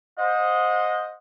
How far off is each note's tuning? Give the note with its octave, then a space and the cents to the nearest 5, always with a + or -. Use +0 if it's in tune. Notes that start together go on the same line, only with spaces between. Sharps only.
C5 +0 D#5 +0 F#5 -35